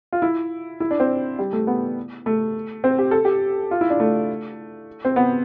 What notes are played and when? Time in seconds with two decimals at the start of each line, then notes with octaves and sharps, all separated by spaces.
0.13 F4
0.22 E4
0.80 E4
0.91 D4
1.00 C4
1.39 G3
1.53 A3
1.67 B3
2.26 A3
2.84 C4
2.99 G4
3.11 A4
3.25 G4
3.71 F4
3.81 E4
3.90 D4
4.00 A3
5.05 C4
5.16 B3